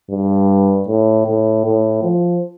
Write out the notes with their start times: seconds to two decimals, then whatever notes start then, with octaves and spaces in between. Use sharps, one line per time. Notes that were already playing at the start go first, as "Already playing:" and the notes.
0.11 G2
0.88 A2
1.27 A2
1.65 A2
2.03 F3